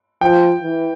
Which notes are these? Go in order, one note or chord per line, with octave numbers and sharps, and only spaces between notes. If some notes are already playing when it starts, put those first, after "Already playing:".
F3 G5
E3